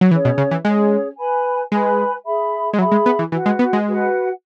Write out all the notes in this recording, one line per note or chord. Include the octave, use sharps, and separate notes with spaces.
F#3
E3 C#4 G#4 C#5
B2
C#3
E3
G#3 C#4 G#4 C#5
B4 G#5 B5
G#3 B4 G#5 B5
G#4 E5 B5
G#3
F#3 G#4 E5 B5
G#3
B3
E3
E3 F#4 B4 F#5
G#3
B3
G#3
F#4 B4 F#5